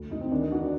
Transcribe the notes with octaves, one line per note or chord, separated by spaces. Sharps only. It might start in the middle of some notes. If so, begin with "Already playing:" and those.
Already playing: D2
D2 D#4
C4
D#3 D4
D#4
D#3 F#4
D4